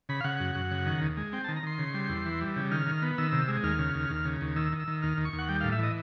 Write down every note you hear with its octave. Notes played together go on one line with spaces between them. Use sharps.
C#3 B5
F5
C#3 F#5
F#2
F#2
C#3
D#3
D#2
G#3
C4 G5
A5
D#3
A#5
D#3 C6
C#3
G3
E2
E3
G3
C#3
D#3 F6
D#3
B3
D#3 E6
C3
G#3
D#2 F6
C#3
D#2
D#2
C#3
D#2
D#3 E6
D#3
E6
D#3
D#2 F6
D#2
C#6
D#2
F#5
G3 G5
A2 F5
E5
E3 D#5